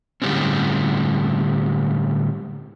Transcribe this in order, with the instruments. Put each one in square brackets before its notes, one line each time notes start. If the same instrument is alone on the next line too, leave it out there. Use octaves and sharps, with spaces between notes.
[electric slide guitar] A2 D3 G3 G#3 C4 C#4